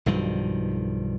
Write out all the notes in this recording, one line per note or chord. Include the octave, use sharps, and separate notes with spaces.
B1 G2 D#3 F3